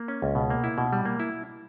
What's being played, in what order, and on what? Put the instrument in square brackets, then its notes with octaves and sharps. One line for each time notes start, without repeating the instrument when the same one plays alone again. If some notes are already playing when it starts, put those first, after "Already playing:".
Already playing: [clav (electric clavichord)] A#3
C#4
C#2
B2
A#3
E4
B2
G3
A#3
E4